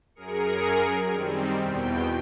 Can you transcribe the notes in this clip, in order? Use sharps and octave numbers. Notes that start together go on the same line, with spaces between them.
F#2 G#4 A#4 C#7
D#3 G3 C4
E2 B2 G5